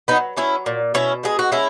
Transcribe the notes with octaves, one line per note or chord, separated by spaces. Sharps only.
F#3 B3 D#4
F#3 C#4 E4
A#2
B2 C#4 E4
G#3 G#4
F#4
G#3 C#4 E4